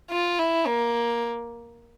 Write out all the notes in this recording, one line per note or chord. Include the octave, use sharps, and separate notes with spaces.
F4
E4
A#3